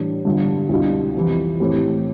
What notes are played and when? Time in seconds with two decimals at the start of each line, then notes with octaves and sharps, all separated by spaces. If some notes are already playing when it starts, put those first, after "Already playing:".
Already playing: A2 E3 G3 D4
0.25 G2 D3 G3 B3 F4
0.69 C2 B2 G3 D4 F4
1.15 F2 C3 E3
1.60 A2 E3 A3 C4 G4